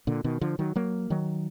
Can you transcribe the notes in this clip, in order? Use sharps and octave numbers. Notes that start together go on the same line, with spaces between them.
A#2 D3
B2 D#3
D3 F3
D#3 F#3
F#3 A#3
D#3 F#3